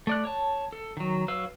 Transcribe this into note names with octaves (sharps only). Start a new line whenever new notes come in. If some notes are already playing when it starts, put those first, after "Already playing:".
A3 D5 F#6
C#5 A5
A4
D#3 F#3
F#3 B4 F5 E6